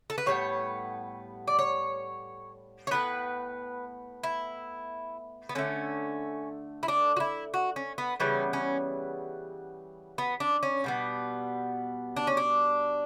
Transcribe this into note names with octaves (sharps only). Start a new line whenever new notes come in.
A4
B4
A2 G3 B3 C#5
D5
C#5
C#5
A2 E3 B3 B4
E4
B3
D3 A3 C#4
E4
D4
F#4
E4
F#4
C#4
B3
C#3 E3 G3 B3 C#4
C#4
B3
D4
C#4
B2 G3 B3
D4
C#4
D4